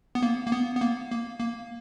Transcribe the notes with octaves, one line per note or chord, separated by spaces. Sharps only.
B3
A#3
A#3
B3
B3
A#3
A#3
A#3